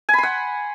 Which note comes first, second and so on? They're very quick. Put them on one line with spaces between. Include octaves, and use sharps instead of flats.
G#5 B5 C6 F#5